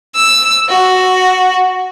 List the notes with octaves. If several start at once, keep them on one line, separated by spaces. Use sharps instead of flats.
E6
F#4